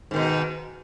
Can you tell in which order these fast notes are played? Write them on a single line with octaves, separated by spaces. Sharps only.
G#2 D#3 B2